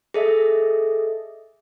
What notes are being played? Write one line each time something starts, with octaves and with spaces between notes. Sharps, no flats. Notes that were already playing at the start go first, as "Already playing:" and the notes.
G#4 A4 D#5 E5